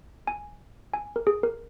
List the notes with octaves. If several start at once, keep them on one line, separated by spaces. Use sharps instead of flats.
G#5
G#5
A#4
G#4
A#4